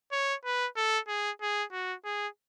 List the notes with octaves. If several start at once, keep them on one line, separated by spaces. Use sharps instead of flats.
C#5
B4
A4
G#4
G#4
F#4
G#4